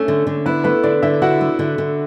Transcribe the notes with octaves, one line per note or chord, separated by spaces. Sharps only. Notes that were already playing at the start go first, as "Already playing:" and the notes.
Already playing: A3 C#4 D4 E4
D3
D3
B3 E4 B4
A3 B3 B4
D3 D4 D5
D3 E4 E5
E4 F#4 F#5
A3
D3
D3